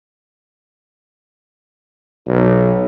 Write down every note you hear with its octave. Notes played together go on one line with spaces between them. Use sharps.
B1